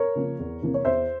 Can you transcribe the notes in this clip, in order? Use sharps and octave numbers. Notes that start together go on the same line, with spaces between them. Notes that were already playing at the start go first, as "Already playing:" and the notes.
Already playing: A#4 C#5
C#3 F3 A#3
E2
C3 E3 A#3
C#5
E2 C5 E5